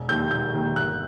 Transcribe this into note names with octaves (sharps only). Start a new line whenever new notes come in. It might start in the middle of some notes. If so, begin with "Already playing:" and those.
Already playing: E1
D#2 D#3 G6
E1 G6
D#2 D#3
G1 F#6